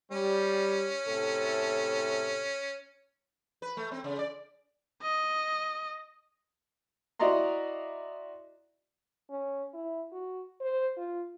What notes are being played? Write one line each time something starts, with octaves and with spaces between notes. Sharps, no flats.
G3 C#4
A2 C3 A4
B4
A3
C4
C#3
D5
D#5
E4 F#4 D5 D#5 A#5 C6
C#4
E4
F#4
C5
F4